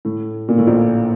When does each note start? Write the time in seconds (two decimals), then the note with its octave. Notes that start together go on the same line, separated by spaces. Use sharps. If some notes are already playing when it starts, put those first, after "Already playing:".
0.05 A2
0.48 A#2
0.58 A2
0.67 A#1 A#2